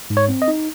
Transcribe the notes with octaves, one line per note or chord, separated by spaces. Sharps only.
G#2
C#5
C4
D#5
D#4